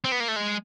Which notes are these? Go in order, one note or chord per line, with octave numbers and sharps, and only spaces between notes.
C4
B3
A#3
A3
G#3